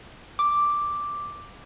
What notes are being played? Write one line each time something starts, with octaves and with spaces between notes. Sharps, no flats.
D6